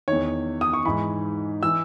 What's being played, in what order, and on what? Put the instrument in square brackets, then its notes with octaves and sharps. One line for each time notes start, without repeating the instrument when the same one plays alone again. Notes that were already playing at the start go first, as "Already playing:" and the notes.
[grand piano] E2 D#3 C#5
D#6
C#6
G#2 E3 B5
E3 E6